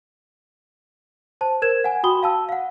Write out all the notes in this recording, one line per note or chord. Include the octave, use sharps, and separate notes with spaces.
C5 A5
A#4 C5 G#6 E7
F#5 G#5
F#4 G5 B5 D#6 G7
F5 A5 E6
F5 F#5